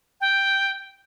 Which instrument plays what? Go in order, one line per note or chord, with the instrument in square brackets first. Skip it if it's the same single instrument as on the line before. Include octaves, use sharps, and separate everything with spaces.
[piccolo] G5